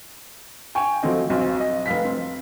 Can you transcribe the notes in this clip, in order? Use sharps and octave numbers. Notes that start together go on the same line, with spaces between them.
G5 G#5 C#6
F3 F#3 A3 C4 D#5
B1 C4
D#5
F1 F5 B6
C4